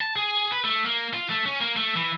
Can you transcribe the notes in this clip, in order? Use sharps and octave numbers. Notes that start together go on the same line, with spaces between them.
A5
G#4
B4
A3
A#3
F4
A3
C#4
A#3
A3
E3